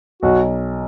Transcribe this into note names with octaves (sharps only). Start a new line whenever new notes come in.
B1 F#4